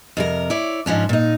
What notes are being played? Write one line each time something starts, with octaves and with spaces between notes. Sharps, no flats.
F2 C3 A#4
E4 C#5 D5
G#2 F3 C#4 D4
A#2 D#4